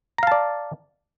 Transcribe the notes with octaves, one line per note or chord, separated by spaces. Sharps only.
D5 F5 A5 A#5